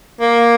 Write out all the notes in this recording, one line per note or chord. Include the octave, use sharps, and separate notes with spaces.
A#3